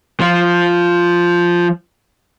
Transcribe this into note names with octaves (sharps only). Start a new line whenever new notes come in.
F3 F4